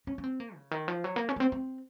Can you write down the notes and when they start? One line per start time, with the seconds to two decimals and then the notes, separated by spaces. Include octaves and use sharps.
0.07 C#4
0.18 C#4
0.24 C4
0.40 A#3
0.55 C#3
0.71 D#3
0.88 F3
1.04 F#3
1.16 A#3
1.29 C#4
1.36 A#3
1.40 C4
1.52 C4